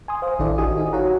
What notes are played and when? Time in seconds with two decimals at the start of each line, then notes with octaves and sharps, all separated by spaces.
0.08 G#5 C6 D#6
0.22 C5 F5
0.39 A1 D#3 D4 E4 A4 D5
0.58 F#4 G4 D#5 G#5 D#6
0.77 D#4
0.93 D#4 F#4 C#5 F5 F#5 A#5